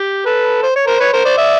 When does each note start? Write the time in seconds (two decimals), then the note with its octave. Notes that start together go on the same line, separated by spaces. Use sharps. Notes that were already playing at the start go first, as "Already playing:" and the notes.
Already playing: G4
0.26 A4 B4
0.63 C5
0.76 C#5
0.87 A#4 C5
1.00 B4 C#5
1.13 A#4 C5
1.25 C5 D5
1.38 D5 E5